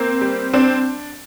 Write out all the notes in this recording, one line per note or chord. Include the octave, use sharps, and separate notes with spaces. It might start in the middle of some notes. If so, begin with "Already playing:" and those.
Already playing: A#3 C4
G3
C4 D4